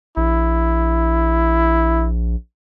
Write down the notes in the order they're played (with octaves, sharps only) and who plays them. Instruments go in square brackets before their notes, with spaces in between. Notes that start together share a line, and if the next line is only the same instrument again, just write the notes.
[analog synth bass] A#1 [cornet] E4